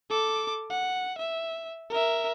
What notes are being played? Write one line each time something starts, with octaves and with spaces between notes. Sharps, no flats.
A4 D6
F#5
E5
A#4 E5